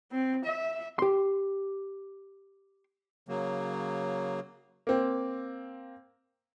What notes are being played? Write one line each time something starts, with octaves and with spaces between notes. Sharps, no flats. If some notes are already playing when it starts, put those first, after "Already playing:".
C4
E5
G4 C6
C#3 F#3 A#3
A#3 C4